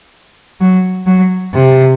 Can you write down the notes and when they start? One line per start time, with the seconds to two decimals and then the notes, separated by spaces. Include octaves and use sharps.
0.60 F#3
1.06 F#3
1.54 C3